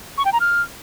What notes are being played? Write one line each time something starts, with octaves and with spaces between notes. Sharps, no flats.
C#6
G5
A#5
F6